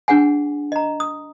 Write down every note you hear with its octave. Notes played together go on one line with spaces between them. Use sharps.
D4 G#4 F#5 G#5
D#5 A#5
D#6